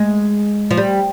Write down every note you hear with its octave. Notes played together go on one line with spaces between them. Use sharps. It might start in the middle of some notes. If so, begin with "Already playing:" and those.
Already playing: G#3
F3
G3